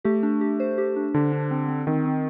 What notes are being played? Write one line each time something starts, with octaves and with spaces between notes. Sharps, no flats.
A3 G4
D4
G4
C5
G4
D4
D3 D4
D4
C4
C4
D#3 C4
C4